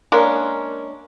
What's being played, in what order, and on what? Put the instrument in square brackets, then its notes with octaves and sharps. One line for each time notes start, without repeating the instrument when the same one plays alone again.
[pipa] G#3 A#3 C#4 D4